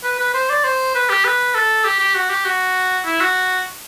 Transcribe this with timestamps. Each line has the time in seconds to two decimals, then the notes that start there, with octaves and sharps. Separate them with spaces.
0.04 B4
0.19 B4
0.34 C5
0.50 D5
0.64 C5
0.95 B4
1.10 G4
1.25 B4
1.55 A4
1.85 G4
2.00 G4
2.15 F#4
2.30 G4
2.45 F#4
3.05 E4
3.20 F#4